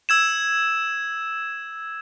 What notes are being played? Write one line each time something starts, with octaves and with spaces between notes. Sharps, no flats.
E6 G#6 E7